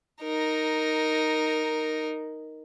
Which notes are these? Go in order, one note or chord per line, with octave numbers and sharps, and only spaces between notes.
D#4 A#4